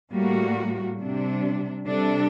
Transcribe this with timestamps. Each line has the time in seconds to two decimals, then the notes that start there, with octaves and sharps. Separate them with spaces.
0.12 A2 G3 A#3 F#4
0.99 C3 G3 D4
1.87 C3 G3 D4 A4